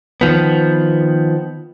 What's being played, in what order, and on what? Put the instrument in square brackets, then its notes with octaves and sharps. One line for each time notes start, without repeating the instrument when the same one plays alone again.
[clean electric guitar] D#3 F3 B3